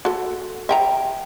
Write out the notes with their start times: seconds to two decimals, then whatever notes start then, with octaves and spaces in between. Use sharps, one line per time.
0.05 F#4 A4
0.69 E5 G5 A#5